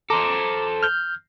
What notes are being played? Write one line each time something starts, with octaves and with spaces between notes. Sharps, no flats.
A4 C5 A#5 D6
F6 G6